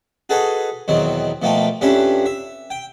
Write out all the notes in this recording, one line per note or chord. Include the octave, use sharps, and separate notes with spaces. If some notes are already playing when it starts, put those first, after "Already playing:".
F#4 G#4 A4 B4 D#5 G#5
E2 B2 D#3 F#3 C4
B2 F3 A3 A#3 G5
F2 C#4 D4 G4 B4 E5
E5
G5